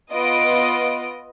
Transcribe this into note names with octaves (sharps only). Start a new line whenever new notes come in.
B3 F4 D#5 D7